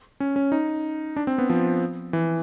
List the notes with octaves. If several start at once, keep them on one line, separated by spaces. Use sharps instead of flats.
C#4
C#4
D#4
D4
C4
B3
F3
E3